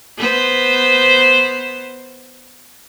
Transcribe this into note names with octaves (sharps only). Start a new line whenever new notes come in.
B3 C5